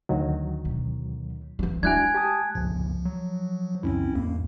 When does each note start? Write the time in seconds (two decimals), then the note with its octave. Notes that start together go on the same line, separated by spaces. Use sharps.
0.09 D2 D#3 F#3
0.65 B2
1.59 E3 F3
1.83 G#3 A3 D4 E4 F#4 G#5 F#6 G#6
2.14 G4 A5 D#6
2.55 G1 C#2 F3
3.05 F#3
3.83 C#2 F#2 C4 C#4 E4
4.16 E2 G#2 A#3